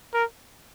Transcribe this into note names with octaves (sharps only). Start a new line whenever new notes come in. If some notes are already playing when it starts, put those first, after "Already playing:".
A#4